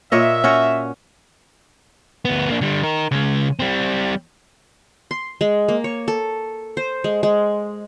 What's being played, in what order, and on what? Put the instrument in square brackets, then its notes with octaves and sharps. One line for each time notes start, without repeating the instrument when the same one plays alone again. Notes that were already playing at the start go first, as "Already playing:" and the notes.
[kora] A#2 C#5 D#5 [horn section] E5
[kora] C#4 F#4 C#5
[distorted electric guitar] D2 B3
A#3 D4
D3 G3
D#4 A#4
C#3 G#3
G3 C4
[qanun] C6
G#3
A#3
C#5
A4
C5
G#3
G#3